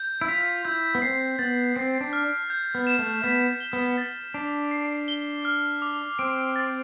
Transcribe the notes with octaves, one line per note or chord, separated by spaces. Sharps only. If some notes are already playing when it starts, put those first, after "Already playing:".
Already playing: G6
E4
F4 B6
E4 G6
B3
C4 C7
B3 A6
C4 C7
D4
F6
G6
B3
E7
A3
B3 B6
G7
B3
A6
D4 D6
C7
G7
F6
D6
C4 D7
A6